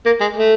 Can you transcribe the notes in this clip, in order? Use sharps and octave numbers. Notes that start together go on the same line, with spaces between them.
A#3
G#3
A3